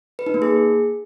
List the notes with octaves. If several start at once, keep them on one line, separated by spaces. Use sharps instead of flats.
B4
D#4
A#3
G#4